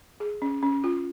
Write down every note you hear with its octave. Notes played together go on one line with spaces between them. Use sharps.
G#4
C#4
C#4
F4